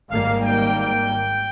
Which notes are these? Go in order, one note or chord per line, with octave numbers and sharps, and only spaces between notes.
G#1 G#2 D#3 G3 A#3 F5
G5